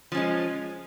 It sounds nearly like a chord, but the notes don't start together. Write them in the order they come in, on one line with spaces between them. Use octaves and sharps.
F3 C#4 G#3